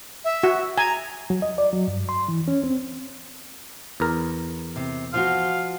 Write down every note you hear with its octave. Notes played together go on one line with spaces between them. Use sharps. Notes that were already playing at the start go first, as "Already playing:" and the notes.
E5
F#4
G#5 A#5
F#3
D#5
D5
F#3
G2
C6
E3
C#4
C4
E2 A#4
C3
F3 F4 F#4 F5